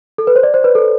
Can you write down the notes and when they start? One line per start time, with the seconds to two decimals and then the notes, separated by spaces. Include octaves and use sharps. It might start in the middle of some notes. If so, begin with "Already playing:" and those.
0.18 A4
0.27 B4
0.36 C5
0.43 D5
0.54 C5
0.64 B4
0.75 A4